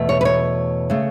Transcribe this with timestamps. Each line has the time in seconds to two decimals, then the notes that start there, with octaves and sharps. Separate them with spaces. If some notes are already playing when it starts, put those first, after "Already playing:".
Already playing: E2 B2 A3
0.09 C#5
0.21 B4
0.25 C#5
0.90 C#3 A3